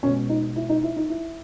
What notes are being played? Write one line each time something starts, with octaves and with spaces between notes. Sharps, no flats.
B2 G#3 C#4
D#4
E4
D#4
E4
D#4
E4